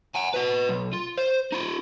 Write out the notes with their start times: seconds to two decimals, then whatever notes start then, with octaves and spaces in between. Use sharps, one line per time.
0.15 F#5 G#5
0.34 B4 D#5
0.69 B1
0.93 F4
1.17 C5
1.53 D#4 F4